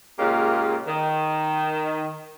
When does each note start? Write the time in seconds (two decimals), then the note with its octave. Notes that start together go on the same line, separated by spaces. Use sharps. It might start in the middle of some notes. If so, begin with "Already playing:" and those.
0.19 A#2 C#3 G#3 A#3 G4
0.87 D#3